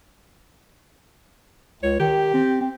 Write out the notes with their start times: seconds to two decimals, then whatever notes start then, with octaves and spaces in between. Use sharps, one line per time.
1.83 C#2 C#5
2.00 D#3 G4
2.34 C4
2.61 C4